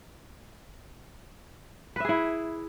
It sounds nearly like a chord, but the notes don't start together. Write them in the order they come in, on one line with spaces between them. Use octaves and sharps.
B4 E5 G#4 E4